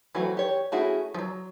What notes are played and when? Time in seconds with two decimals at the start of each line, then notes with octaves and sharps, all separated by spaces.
0.15 E3 F#3 A3 C4 F#4
0.37 G4 C#5
0.72 A3 C#4 E4 F#4 G#4
1.14 F3 F#3